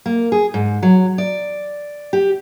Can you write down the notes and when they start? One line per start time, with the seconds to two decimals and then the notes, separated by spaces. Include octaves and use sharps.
0.06 A#3
0.32 G#4
0.54 G#2
0.82 F#3
1.18 D5
2.13 G4